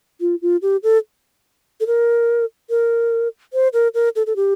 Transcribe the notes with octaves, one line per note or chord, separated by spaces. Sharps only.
F4
F4
G4
A4
A4
A#4
A#4
C5
A#4
A#4
A4
A4
G4